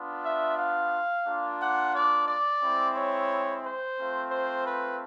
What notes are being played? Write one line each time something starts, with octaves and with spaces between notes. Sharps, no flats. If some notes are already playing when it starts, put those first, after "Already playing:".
Already playing: B3 D4 F4
E5
F5
A#3 D4 F4
F#5
D5
D5
G#3 C4 E4
C#5
C5
A3 C4 F4
C5
B4